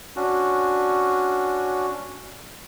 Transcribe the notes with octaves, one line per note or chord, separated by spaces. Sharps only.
C#4 D4 F#4